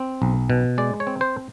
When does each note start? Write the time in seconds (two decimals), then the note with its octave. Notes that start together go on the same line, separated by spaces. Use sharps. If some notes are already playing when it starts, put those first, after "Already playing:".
Already playing: C4
0.22 B1
0.50 B2
0.78 G#3 D5
1.00 C#5
1.07 C4
1.21 C5